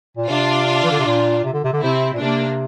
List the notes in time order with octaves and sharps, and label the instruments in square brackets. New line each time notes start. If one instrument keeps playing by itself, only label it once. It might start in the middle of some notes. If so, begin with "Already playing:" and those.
[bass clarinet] A#2
[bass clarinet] C3 [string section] D4 F4
[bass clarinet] E3
D3
C3
A#2
C3
D3
C3
D3
[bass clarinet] C3 [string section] C4 E4
[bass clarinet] A#2
[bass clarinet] C3 [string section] A#3 D4